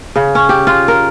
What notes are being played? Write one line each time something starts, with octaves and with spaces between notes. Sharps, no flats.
C#3
C#4
G4
F4
A#4